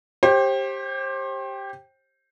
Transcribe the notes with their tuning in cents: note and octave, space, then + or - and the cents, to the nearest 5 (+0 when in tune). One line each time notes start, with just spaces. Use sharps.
G4 +0 C5 +35